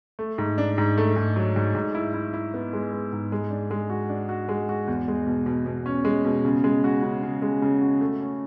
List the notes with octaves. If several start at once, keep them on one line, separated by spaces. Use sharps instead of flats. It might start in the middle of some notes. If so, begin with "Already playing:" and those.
A3
G#2
D4
G#2
A3
G#2
F#3
G#2
G#2
E4
E4
E4
B3
G#3
B3
G#2
G#3
D4
G#3
F#4
D4
F#4
G#3
F#4
E2
G#3
B2
B2
B2
C#4
G#3
B2
C#3
G#3
F#4
C#3
C#3
G#3
C#3
F#4
A3
C#4